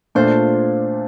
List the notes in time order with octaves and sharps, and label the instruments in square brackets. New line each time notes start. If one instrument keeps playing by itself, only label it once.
[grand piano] A#2 A3 D4 F4 [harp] C5